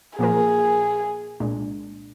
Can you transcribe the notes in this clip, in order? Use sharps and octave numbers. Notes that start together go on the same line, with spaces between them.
A#2 F3 A#3 F4 G#4 A#4
C2 A#2 G#3 D4